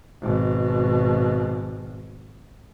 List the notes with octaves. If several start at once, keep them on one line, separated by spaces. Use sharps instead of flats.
G#1 B2